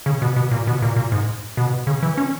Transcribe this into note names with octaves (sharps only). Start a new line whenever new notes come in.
C#3
B2
B2
A#2
B2
A#2
A#2
G#2
B2
C#3
E3
C#4